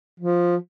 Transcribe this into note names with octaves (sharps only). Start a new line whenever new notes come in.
F3